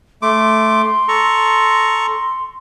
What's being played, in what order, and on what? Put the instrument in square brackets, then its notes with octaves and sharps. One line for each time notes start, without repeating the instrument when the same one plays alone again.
[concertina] A3 D6 [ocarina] C6
[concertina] A4 A#5 C#6